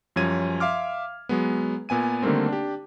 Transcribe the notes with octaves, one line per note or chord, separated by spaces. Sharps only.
F#2 F3 G3 C#4 G#6 D#7
E5 F5 C6 D6 F6
F#3 G#3 B3
A#2 B3 G#5 D#7
D3 D#3 G3 A3 A#3 C4
D4 G4